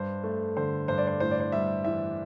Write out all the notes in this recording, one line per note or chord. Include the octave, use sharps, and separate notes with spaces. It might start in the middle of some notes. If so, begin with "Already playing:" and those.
Already playing: G2 C5
A3
D3 C5
G2 C5
D5
C5
A2 C5
D5
C5
G3 E5
E3 E5